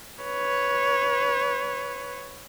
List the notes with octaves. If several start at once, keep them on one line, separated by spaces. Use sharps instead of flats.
B4 C#5